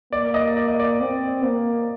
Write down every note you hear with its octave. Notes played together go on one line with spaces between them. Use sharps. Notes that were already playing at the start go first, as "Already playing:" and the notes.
A#3 D5
D#5
D5
D#5
D5
C4
A#3